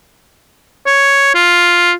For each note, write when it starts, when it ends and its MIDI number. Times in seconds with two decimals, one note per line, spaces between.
0.86 1.30 73
1.35 1.93 65